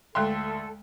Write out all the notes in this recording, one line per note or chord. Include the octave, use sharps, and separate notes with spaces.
D2 G#3 A4 E5 G5 C6